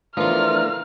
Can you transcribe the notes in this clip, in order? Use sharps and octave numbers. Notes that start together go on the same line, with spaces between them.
E3 F3 A3 B3 D4 F4 A#4 F6